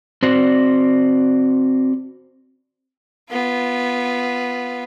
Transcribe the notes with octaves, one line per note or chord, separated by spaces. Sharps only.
C4 F#4 C5 D5
B3 F4